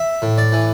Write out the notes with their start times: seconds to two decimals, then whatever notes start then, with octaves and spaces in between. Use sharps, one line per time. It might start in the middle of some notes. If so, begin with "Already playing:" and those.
Already playing: E5
0.22 A2
0.38 D5
0.52 E3